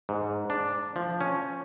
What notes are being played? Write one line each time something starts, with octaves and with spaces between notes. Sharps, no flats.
G#2
D4
F3
C#4